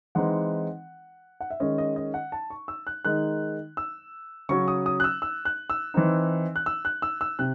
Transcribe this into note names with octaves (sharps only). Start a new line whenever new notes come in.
E3 G#3 C4 D#4 F#5
F#5
E5
D#3 G#3 C#4 D#5
D#5
D#5
F#5
A5
C#6
E6
F#6
D#3 G#3 D#4 F#6
E6
C#3 F#3 C#4 C#6
D#6
D#6
F#6
E6
E6
F#6
E6
E3 C4 D#4
F#6
E6
F#6
E6
E6
C3 F#6